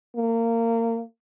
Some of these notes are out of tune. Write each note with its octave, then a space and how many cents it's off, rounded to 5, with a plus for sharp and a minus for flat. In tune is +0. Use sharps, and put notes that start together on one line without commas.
A#3 -25